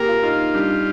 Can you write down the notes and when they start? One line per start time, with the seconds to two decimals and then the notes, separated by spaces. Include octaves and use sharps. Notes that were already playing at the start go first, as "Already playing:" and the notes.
Already playing: A#3 G4 G#4 A#4
0.08 F4
0.23 D#4 F4
0.54 G3 D4